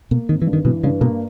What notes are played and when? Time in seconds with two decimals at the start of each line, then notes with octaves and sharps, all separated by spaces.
0.11 B2 A#3
0.29 G#1 D#3
0.42 E3
0.47 G2
0.53 D#3
0.65 B2 E3
0.84 G2 C#3
1.01 B2 A#3